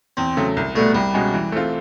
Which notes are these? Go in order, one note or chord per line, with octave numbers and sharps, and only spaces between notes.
E2 C4
C#3 F#3 A3
C2
B2 G3 A3 B3
C2 G3
B2 G#3 C#4 F#4
E3
A3 C4 F4